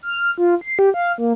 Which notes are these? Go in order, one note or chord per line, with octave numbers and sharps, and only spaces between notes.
F6
F4
C7
G4
F5
A#3